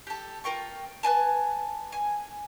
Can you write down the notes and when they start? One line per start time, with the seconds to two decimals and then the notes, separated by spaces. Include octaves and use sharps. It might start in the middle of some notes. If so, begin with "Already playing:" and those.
0.07 G4 A4
0.44 F4 A#4 G5 C#6
1.03 B4 D5 G#5 A5
1.92 G#5